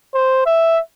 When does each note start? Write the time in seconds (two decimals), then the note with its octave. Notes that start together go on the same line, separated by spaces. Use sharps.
0.15 C5
0.46 E5